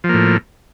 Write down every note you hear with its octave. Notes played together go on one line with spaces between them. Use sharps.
A2 F3 A#3